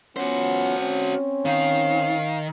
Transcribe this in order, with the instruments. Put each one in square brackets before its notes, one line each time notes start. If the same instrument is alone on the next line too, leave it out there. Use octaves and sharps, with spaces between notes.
[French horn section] F3 B3 C#4 [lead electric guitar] F#4 C5 [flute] F#5
[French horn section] C4 C#4
[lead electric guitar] D#3 [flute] F5